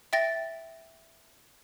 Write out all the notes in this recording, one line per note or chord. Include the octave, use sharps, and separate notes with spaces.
E5 G5 A6 A#6